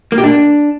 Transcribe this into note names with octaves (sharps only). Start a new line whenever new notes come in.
A#3
G4
D4